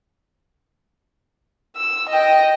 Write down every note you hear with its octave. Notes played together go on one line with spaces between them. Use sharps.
E6
D#5 G5